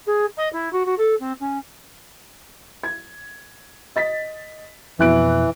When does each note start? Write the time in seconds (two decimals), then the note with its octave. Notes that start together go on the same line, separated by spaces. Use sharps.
0.06 G#4
0.37 D#5
0.52 E4
0.72 F#4
0.85 F#4
0.98 A4
1.20 C4
1.40 C#4
2.83 G#6
3.96 D#5 A6 B6
4.99 F2 B2 E3 E4 F#6 D7